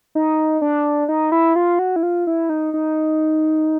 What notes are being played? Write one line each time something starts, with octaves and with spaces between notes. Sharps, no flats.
D#4
D4
D#4
E4
F4
F#4
E4
F4
E4
D#4
D#4